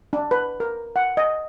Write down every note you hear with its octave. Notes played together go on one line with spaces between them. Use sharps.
D4
B4
A#4
F#5
D#5